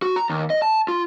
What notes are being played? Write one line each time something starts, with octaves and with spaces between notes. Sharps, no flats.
F#4
A#5
D#2
D#5
A5
F4